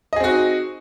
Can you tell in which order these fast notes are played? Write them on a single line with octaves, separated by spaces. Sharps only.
D#5 G#4 C4 F#4 D#4